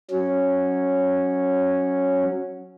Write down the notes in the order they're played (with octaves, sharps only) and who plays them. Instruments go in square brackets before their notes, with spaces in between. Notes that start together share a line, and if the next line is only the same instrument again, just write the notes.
[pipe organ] F#3 C#4